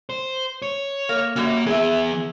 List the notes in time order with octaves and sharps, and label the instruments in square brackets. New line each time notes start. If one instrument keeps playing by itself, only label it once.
[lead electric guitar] C5
C#5
[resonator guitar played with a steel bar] A#3
[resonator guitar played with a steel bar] F#2 F#3 G3 [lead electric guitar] A#3
[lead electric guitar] E3 B3 [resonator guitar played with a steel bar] G#4 E5